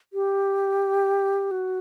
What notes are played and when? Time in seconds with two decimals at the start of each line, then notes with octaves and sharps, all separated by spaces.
0.13 G4
1.51 F#4